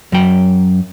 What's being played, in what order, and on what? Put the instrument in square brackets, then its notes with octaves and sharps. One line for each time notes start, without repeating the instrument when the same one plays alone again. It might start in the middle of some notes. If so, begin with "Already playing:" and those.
[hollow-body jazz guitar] F#2 F#3 G5